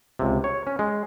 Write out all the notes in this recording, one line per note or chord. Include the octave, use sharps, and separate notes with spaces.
C#2 C3
C#5
C#4
G#3